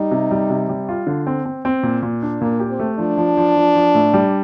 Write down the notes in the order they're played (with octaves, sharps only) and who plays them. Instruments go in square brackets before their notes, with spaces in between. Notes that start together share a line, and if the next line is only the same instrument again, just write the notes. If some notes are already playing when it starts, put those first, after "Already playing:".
Already playing: [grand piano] G3 [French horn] D#4
[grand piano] C3
G3
C3
G3
F4
D3
C4
C4
C4
A#2
A#2
D4
[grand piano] A#2 [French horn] A#3
[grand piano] G4
[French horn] C4
[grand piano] A3
[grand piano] F3 [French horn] D4
[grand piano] F3
F3
F3
F3
A2
G3